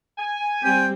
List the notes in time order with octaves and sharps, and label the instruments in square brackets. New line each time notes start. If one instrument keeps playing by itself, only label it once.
[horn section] G#5
[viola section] G3 C4 [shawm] G5